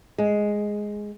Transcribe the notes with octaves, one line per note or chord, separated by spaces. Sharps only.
G#3